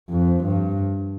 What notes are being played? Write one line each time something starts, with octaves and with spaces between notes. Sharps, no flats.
F2
G2